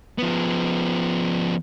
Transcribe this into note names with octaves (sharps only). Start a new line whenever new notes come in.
F3 B3